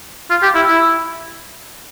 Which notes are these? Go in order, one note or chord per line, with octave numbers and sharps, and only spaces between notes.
F4
G4
E4
E4